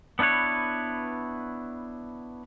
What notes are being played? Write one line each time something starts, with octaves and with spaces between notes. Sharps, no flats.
B3 D4 E4 B4 C#5